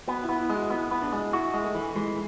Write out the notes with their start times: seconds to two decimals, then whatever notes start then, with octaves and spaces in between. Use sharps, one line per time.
0.07 B3 F#4
0.23 E4
0.29 B3
0.39 E4
0.50 G#3
0.55 F#4
0.70 B3 E4
0.91 B3
1.02 D4
1.12 G#3
1.33 E4 F#4
1.54 G#3
1.64 A3
1.75 E3
1.96 E3 G#3